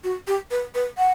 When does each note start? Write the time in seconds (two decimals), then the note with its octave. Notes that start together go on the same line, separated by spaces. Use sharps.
0.04 F#4
0.27 G4
0.51 B4
0.75 B4
0.98 F#5